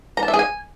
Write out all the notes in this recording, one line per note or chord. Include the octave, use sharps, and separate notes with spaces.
A#5
A5
E5
G#4
G#5